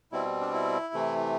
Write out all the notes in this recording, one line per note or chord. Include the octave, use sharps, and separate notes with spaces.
B2 G3 C4 E4
D4
E4
C3 E3 A3